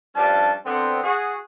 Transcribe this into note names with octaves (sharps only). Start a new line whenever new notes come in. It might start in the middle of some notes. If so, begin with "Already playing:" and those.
G2 F3 G3 C#4 D4 A5
D3 B3 C4
F#4 G#4